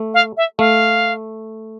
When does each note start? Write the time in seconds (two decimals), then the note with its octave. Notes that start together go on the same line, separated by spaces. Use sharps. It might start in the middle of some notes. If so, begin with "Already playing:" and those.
Already playing: A3
0.14 F5
0.37 E5
0.59 A3 F5